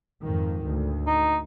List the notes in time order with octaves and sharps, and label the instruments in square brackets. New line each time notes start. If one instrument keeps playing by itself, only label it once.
[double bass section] F2 G#2 D#3
D2
[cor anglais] D#4